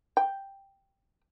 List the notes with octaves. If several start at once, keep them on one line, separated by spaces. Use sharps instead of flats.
G5